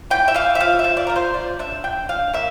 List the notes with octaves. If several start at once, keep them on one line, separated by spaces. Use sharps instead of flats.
E3 G5
E5
E3 F5
E5
F3 F5
E5
F3
D5
F3 A#4
C5
F3 D5
D4 E5
D4 G5
D4 F5
A#3 E5